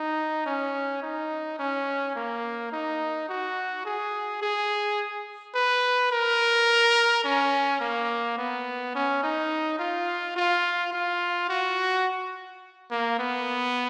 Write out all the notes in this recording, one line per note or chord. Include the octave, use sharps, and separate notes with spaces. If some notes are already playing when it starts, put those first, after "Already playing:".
Already playing: D#4
C#4
D#4
C#4
A#3
D#4
F#4
G#4
G#4
B4
A#4
C#4
A#3
B3
C#4
D#4
F4
F4
F4
F#4
A#3
B3